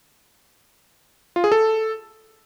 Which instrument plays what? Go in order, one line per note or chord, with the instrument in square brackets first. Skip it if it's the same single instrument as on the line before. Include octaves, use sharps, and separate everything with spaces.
[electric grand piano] F4
G#4
A4